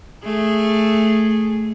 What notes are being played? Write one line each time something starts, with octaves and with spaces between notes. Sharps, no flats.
A3 G#4